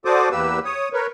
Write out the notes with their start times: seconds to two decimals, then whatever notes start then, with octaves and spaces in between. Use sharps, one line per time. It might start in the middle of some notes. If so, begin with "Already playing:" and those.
0.05 F#4 A4 C5 D5 D6 D#6
0.32 E2 A#3 G4 B4 E6
0.65 C#5 D#6
0.93 A#4 B4 C#5